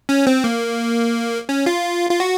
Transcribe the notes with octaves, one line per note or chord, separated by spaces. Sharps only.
C#4
C4
A#3
C#4
F4
F4
F#4